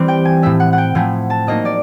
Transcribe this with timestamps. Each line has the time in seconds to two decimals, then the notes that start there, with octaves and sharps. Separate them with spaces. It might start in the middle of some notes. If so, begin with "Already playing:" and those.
Already playing: E3 G3 C4
0.08 G5
0.25 G#5
0.42 A2 F3 A3 E5
0.60 F#5
0.73 F#5
0.78 G5
0.95 A2 F3 A3 G#5
1.30 A5
1.47 F#3 A#3 D#4 D#5
1.65 D5